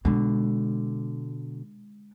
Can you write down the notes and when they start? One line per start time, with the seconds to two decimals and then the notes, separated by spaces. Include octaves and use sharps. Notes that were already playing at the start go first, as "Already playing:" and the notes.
0.05 B2 D3 G#3 D4